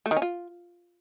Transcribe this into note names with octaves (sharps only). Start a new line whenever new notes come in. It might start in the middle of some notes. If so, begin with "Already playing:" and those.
A3
D#3
C#4
F4